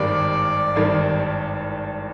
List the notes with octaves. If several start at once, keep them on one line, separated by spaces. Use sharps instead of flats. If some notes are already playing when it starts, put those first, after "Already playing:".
Already playing: G#1 G2 D#3 G3 D5
G#1 G2 D#3 G3